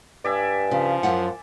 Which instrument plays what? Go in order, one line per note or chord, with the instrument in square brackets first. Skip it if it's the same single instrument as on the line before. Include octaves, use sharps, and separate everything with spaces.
[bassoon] G2 [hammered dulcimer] D5 E5 G#5
[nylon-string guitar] C#3 [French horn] F3
[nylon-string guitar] F#2 F4 F#5